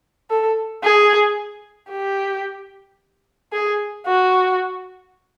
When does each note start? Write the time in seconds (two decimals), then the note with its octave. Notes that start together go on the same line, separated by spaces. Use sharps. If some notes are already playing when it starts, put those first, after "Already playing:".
0.30 A4
0.84 G#4
1.91 G4
3.53 G#4
4.07 F#4